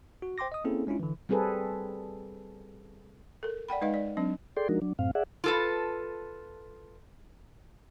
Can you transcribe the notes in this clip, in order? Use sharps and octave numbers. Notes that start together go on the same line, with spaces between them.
F#4
C5 G5 C6 D6 A#6
D#5 D#6
A#3 C4 C#4 E4 G#4 A4
G#3 C#4 D4 E4 F4
D3 E3
G3 C4 G#4 A4 B4
A4 A#4
D5 F#5 G5 B5
G#3 D#4 B4 D#5 F5
D5
F#3 C4 D4
G#4 A4 D5 G5 C6
F3 G#3 D4 D#4 F#4 A#4
F#3 D4
F#2 A2 C4 F5
G#4 D5 E5 F#5
F4 A4 B4